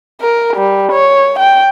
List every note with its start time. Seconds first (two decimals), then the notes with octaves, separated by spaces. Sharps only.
0.21 A#4
0.57 G3
0.92 C#5
1.39 G5